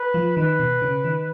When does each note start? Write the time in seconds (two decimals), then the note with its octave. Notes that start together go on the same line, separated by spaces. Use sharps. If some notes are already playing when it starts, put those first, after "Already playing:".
Already playing: B4
0.14 F3
0.37 D#3 B4
0.59 B2
0.82 C#3
1.04 D#3